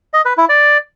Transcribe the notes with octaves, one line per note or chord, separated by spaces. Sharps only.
D#5
B4
E4
D5